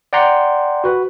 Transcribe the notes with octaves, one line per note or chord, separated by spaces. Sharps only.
D5 F#5 G5 A#5 C6
F#4 B4